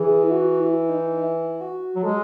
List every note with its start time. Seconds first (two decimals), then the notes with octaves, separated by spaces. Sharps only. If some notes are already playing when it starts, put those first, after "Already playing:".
Already playing: E3 G#4
0.24 E4
0.31 F#4
0.60 E4
0.89 D#4
1.17 E4
1.61 F#4
1.96 F#3
2.03 G#3 A4